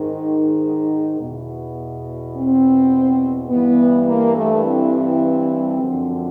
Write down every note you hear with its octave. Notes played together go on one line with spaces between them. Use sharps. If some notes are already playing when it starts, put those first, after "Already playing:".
Already playing: G#2 D#3
E2 B2
C4
G2 E3 B3
A#3
A3
C4
F#2 D3 F3